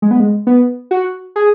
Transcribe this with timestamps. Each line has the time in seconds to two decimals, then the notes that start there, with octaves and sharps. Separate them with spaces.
0.02 G#3
0.11 B3
0.20 G#3
0.47 B3
0.91 F#4
1.36 G#4